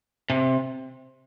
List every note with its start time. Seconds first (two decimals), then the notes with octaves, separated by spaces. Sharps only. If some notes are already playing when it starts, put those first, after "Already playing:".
0.30 C3